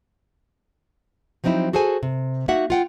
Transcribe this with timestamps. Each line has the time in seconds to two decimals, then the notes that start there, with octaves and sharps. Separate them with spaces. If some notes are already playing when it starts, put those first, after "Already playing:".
1.44 F3 F#3 C4 D#4 E4
1.73 F#4 G#4 A4 C5 G#5
2.03 C3
2.48 A#3 D#4 F#4 E5 F#5
2.70 F4 F#5 G5